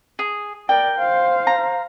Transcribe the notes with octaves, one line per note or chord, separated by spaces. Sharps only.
G#4
A#4 D5 G5
C5 F5
A#5